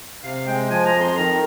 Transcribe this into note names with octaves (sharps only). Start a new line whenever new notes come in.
C3 F5
G#3 G5
F3 G#5
A#5
F2
C6
D#3 A#5